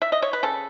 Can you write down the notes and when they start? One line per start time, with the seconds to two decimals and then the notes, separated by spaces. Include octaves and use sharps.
0.02 E5
0.12 D#5
0.22 C#5
0.33 B4
0.43 C#3 A4